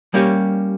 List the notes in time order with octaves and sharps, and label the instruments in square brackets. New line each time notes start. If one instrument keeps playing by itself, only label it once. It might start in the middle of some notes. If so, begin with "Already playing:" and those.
[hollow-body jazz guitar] G3 A#3 C#4 G4 C#5